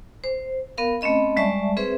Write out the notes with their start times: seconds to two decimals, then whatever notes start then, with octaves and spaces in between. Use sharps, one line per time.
0.24 C5
0.78 B3 A#4 F5
1.01 A3 C4 C#4 D#5 B5
1.37 G3 G#3 D5 E5 A5 C#6
1.77 C4 G#4 B4 C5 E5